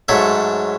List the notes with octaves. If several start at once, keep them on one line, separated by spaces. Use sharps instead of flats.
G#2 F#3 A3 C#5 E5